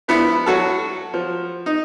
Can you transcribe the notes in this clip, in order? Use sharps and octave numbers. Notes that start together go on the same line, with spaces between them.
F3 B3 D4 E4
F#3 F#4 A4
F3
D#4